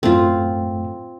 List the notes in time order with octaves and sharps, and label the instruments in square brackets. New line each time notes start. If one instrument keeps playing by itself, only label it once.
[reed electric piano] F#2 A2 A3 [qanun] C4 F4